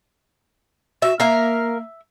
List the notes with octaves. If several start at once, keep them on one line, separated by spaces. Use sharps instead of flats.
F#4 E5
A#3 A#4 E5 F5